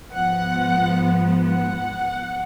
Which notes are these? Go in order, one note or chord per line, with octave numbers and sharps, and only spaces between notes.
G#2 F3 B3 F#5
F#5